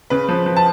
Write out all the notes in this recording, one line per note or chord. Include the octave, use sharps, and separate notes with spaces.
C#3 B4
F3
F3
A5